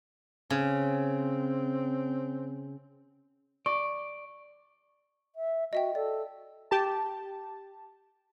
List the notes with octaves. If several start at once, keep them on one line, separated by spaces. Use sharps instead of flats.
C#3 C4
D5 C#6
E5
F#4 D#5 E5 G5
A4 D5
G4 A5